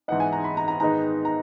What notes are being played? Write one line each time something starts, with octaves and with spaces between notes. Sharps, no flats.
G#2 E3 B3 D#4 F#5
G#5
A#5
B5
A#5
A#5
G#2 D#3 G#3 B3 D#4 A#5
A#5